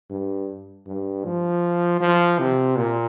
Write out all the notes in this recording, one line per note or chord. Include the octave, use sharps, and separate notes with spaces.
G2
G2
F3
F3
C3
A#2